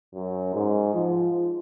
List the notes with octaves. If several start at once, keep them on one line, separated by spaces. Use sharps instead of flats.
F#2
G#2
F3